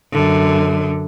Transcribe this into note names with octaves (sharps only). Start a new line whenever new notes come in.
F#2 D3